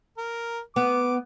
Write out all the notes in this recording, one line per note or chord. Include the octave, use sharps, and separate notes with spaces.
A#4
B3 D6